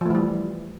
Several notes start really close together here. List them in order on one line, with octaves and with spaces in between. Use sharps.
F3 A3 E3 G3